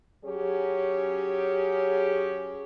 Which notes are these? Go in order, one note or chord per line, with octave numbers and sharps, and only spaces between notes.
F#3 C#4 G4 G#4